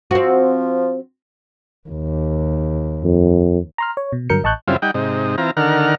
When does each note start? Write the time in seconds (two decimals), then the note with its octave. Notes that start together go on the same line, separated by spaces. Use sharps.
0.11 F3 C4 F#4
1.89 D#2
3.04 F2
3.78 A#5 C6 F6
3.97 C#5
4.13 B2
4.29 G2 D3 F#3 A#4 G6 C#7
4.43 A1 D#5 A5 C#6 F#6 G6
4.68 F#2 C#3 G3 C4 E4 F4
4.82 G3 D#4 F#5 G5
4.94 G#2 C3 D#4
5.38 E3 C4 F4 A#5
5.57 D3 D#3 A#4 F#5 F6